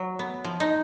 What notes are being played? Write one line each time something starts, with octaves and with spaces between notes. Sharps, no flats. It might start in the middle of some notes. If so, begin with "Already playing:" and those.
Already playing: F#3
B3
F3
D#4